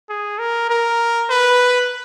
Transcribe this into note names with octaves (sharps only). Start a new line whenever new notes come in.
G#4
A#4
A#4
B4